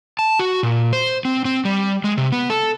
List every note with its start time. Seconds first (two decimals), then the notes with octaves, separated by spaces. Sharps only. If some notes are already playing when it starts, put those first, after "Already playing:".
0.19 A5
0.39 F#4
0.63 A#2
0.93 C5
1.25 C4
1.45 C4
1.65 G3
2.04 G#3
2.18 C3
2.32 B3
2.50 A4